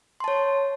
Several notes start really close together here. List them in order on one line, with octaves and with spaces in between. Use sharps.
C6 A5 C#5